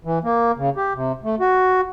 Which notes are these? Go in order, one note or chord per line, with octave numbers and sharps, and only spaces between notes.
E3
A#3
C#3
G4
C3
A3
F#4